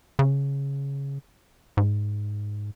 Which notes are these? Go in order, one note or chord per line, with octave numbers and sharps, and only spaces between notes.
C#3
G#2